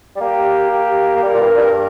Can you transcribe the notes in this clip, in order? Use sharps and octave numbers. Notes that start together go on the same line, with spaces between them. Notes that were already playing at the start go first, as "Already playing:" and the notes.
G3
A#3 G4
G4
A#3
G3 A#4
A#2
G2
G2